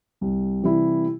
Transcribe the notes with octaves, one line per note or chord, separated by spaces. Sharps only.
C2
C3 E3 G3 E4